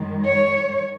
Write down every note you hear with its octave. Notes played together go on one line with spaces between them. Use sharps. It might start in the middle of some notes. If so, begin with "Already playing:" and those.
Already playing: F#2 D#3 G#3
C#5